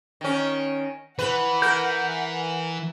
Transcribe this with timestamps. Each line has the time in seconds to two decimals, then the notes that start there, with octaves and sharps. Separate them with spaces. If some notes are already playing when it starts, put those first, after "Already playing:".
0.21 D#3 C#4
1.19 E3 B4 F#5
1.62 A#4 G6